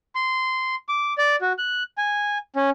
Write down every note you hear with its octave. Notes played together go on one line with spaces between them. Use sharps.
C6
D6
D5
F#4
F#6
G#5
C#4